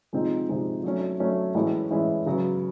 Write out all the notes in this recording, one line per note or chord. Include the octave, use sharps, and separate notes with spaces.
C3 F3 G#3 C4 D#4
C3 F3 G#3 C4 D#4
F#3 A3 C#4
F#3 A3 C#4
A2 E3 G#3 C#4 E4
A2 E3 G#3 C#4 E4
C#3 F#3 B3